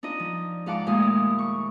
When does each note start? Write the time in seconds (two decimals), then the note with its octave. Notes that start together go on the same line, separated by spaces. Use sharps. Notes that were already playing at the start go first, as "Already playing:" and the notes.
0.03 D4 D#4 F4 D#5
0.20 F3
0.66 G#2 F4 F5 F#5 A5 D6
0.86 D#2 A#2 G#3 A3 F5 D#6
1.39 C#6